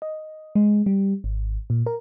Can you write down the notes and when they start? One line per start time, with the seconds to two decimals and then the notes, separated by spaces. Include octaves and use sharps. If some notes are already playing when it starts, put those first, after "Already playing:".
0.02 D#5
0.55 G#3
0.86 G3
1.24 G#1
1.70 A#2
1.86 A#4